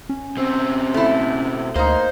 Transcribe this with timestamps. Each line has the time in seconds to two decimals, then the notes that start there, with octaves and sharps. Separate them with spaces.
0.09 C#4
0.37 B2 C4
0.94 A3 E4
1.76 D2 A#3 D#4 C5